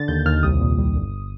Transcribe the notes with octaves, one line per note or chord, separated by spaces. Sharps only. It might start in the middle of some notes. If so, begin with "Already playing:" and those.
Already playing: D3 A6
D#2 G6
D#2 F6
C2 D#6
A#2
G3
G1